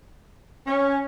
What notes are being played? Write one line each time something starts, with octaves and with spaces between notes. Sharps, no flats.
C#4